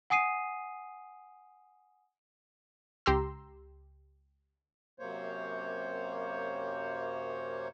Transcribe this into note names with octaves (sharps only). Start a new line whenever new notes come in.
F#5 G#5 D#6 C7 D#7
C#2 G4 A#5 C6 E6
F#2 C3 A#3 C5 C#5